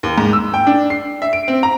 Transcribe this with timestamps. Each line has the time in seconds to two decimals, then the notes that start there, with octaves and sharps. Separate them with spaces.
0.03 D#2
0.18 G#2
0.33 E6
0.54 G5
0.67 D4
0.90 C7
1.22 E5
1.33 D7
1.48 C4
1.63 A#5